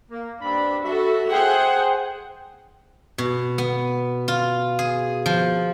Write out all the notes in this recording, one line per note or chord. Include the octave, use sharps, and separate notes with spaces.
A#3
G2 C4 D4 B5
F#4 A4 E5
G#4 C5 F#5 G5
B2
B3
F4
G#4
F3